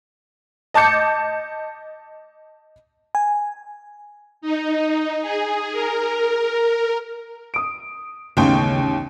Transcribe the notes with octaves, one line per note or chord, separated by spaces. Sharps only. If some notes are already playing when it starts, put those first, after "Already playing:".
D#5 A5 D6 G6 C#7
G#5
D#4
G#4
A#4
D#6 D7
A1 D#2 C#3 B3 C#4 D#4 G5 C6